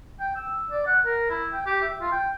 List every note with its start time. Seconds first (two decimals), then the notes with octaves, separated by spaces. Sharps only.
0.20 G5
0.36 E6
0.70 D5
0.86 F#5
1.05 A#4
1.30 E4
1.53 G5
1.66 G4
1.82 E5
2.00 F4
2.12 G5